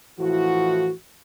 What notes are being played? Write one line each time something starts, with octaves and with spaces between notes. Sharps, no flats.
A2 E3 F3 E4 F#4